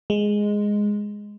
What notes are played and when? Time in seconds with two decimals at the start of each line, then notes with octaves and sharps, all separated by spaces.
0.10 G#3